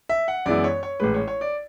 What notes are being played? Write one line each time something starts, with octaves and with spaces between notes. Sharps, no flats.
E5
F#5
F#2 E3 G#3 B3 E4 D5
C#5
C#5
A1 A2 G#3 B4
C#5
C#5
D5